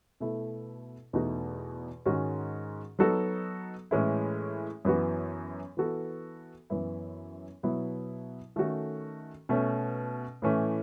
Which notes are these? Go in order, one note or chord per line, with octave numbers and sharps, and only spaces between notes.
B2 A3 E4 A4
E2 B2 A3 D#4 F#4
G#2 D#3 G#3 C#4 F#4
F#3 B3 D#4 F#4 A4
A2 E3 G#3 C#4 E4
F#2 E3 B3 F#4
E3 B3 F#4 A4
F#2 E3 B3 E4
B2 F#3 B3 E4
D#3 A3 C#4 F#4 A4
B2 A3 C#4
A2 E3 A3 C#4